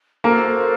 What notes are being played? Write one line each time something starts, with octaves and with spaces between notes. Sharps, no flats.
A#3 F#4 A4 A#4 C5 F5